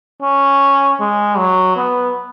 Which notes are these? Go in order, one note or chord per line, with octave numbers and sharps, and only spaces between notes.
C#4
G#3
F#3
B3